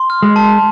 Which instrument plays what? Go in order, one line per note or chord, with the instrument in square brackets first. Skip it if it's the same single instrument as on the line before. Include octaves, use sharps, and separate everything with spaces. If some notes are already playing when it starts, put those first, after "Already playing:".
Already playing: [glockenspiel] C6
F6
[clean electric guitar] G#3
[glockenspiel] A5